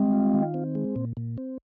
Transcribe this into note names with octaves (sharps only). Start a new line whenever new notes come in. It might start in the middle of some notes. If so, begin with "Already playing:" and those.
Already playing: G3 G#3 C4
F4
D#3
C4
G#3
A#2
A#2
C4